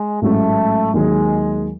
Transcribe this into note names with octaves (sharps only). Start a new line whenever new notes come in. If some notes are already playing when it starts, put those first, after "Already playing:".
Already playing: G#3
A1 G#2 F#3 A3 C#4
D#2 D#3 F#3 G#3